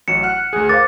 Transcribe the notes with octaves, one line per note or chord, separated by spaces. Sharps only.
A1 F#3 C#7 E7
F#5 F6 F#6
D2 G#4
A#4 C5 F5 D6 A6